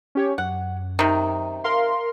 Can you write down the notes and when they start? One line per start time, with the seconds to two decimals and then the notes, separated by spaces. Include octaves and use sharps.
0.15 C#4 G4 C#5
0.38 F#2 F#5
0.99 C3 D#3
1.64 A#4 F5 C6